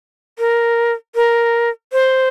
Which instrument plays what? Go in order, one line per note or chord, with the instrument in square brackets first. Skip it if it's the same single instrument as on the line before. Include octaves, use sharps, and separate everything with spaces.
[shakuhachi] A#4
A#4
C5